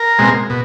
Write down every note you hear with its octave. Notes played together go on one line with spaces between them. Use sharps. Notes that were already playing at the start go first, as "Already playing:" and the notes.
Already playing: A#4
B2 G#3 C4
B2